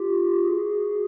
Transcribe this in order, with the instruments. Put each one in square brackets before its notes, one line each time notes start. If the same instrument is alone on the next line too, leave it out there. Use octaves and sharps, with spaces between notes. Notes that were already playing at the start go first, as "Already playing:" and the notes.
Already playing: [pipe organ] F4 G4
F#4 G#4